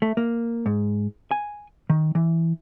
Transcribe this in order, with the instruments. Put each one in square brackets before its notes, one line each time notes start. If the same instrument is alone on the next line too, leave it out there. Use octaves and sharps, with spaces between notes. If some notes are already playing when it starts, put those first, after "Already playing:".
[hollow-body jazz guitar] A3
A#3
G#2
G#5
D#3
E3